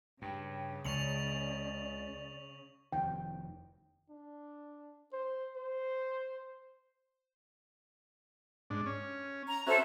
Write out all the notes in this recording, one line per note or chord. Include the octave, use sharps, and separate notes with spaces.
G2 C#3 G5
C#2 D5 C#6 F7 F#7
F1 F2 D#3 G5
D4
C5
C5
G#2 D4
C#4
A#5
C#4 F#4 A4 C5 E5